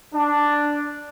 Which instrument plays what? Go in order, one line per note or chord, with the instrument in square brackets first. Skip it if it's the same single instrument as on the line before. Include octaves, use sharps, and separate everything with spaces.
[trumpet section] D4